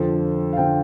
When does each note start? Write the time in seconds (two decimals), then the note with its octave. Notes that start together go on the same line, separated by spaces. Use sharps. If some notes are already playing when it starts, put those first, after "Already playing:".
Already playing: F2 D3 F3 A4
0.53 F5
0.57 D3 F3 G5